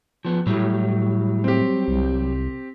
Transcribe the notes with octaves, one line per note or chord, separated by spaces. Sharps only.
F3 B3
A2 F#3 G3
C4 G4
C2